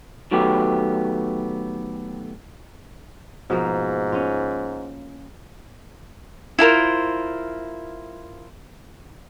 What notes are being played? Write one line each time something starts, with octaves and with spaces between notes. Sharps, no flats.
D#3 F#3 A3 B3 G4
G#2 B2 F3 A#3
C#4 F4
E4 F4 A#4 C5